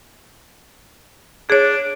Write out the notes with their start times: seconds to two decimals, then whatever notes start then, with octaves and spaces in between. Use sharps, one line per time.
1.50 D4 G#4 C#5